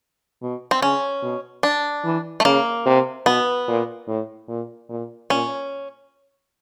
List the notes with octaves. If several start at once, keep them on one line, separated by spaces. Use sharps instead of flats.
B2
C4
C#3 C#4
B2
D4
E3
A3
C#3 A#3
C3
B2 B3
A#2
A2
A#2
A#2
A#2 C#4